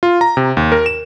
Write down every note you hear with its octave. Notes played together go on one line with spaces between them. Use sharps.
F4
A#5
C3
D#2
A#4
E7